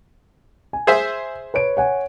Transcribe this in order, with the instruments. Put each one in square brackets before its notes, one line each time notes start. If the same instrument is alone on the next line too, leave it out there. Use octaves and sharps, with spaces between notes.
[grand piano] G#5
[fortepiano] G#4 C5 E5
[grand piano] B4 C#5 D7
C#5 F#5 G#5